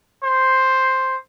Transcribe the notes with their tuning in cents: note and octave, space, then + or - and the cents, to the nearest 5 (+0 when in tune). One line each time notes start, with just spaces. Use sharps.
C5 +5